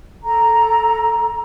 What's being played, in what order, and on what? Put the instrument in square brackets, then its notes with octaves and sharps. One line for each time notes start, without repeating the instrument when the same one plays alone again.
[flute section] A4 A#5